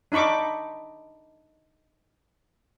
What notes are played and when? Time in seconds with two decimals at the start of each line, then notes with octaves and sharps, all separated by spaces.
0.12 D4 D#4 B5 C#6 D6